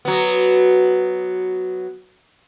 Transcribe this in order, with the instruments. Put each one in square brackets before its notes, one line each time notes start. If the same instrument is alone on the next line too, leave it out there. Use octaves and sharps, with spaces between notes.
[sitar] F#3 B3